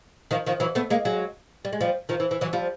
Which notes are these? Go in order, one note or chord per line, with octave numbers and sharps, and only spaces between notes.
D#3 F3
D#3 F3
E3 F#3
A3 B3
G#3 A#3
F#3 G#3
G3
G#3
F3 G3
D#3 F3
E3
E3
E3 F#3
F3 G3